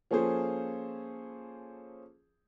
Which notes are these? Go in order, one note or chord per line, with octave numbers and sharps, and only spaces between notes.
F3 A#3 C#4 G#4 A4 C5